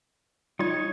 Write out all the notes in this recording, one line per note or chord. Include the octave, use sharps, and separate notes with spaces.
G3 D#4 F4 C#5 G#6